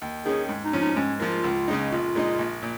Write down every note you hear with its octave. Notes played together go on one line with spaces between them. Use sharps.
D#2
D#3 C#4 G#4
G#2
D#4
F3 C#4
D#4
G#2 C#4
F3 A#3 F4
C#2
C#3 G#3 D#4
A#1 F4
A#2 G#3 D#4
A#1
A#2